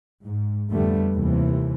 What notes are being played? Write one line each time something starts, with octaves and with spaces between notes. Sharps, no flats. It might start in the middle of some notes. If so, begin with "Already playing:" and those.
G#2
F2 D3 G3 A3 B3
D#2 C3 E3